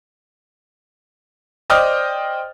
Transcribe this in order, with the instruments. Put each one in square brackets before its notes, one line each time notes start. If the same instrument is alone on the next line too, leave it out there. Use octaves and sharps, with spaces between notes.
[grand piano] C5 D5 D#5 G5 D#6 F6